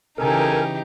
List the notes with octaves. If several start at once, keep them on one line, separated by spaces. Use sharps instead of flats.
C#3 E3 D#4 G4 A4 A#4 G#5